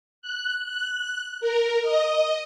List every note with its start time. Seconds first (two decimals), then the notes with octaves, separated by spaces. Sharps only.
0.22 F#6
0.65 F#6
1.40 A#4
1.82 D#5